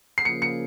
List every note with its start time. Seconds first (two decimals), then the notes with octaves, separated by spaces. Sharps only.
0.18 C7
0.25 C#3 F3 A#3 C#7
0.42 C#7